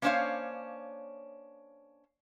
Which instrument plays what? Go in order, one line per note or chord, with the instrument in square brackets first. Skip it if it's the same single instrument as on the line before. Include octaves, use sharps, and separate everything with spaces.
[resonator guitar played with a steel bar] A#3 C#4 D4 C5 C#5 F5